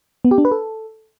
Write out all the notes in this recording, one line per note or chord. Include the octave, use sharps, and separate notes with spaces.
B3
G4
D4
B4
A4